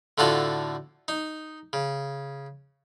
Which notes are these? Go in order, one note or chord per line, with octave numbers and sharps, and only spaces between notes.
A2 D3 F4 F#4 A4
D#4
C#3